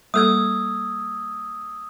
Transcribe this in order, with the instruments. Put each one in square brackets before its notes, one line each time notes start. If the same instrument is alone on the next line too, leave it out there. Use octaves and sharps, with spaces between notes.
[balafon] G3 A#3 A4 [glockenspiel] D#6 E6 G#6